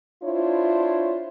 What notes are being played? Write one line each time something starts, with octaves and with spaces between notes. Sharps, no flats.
D4 E4 F4 C5 C#5